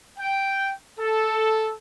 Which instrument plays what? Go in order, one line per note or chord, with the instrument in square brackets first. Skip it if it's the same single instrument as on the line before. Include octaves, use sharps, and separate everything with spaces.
[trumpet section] G5
A4